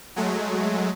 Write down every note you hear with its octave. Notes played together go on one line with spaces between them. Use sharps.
F#3 G#3 A3